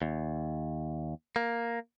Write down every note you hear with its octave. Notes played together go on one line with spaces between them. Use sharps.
D#2
A#3